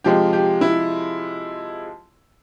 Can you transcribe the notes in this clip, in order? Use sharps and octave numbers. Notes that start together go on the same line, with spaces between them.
C3 F3 G#3 G4
G4
E4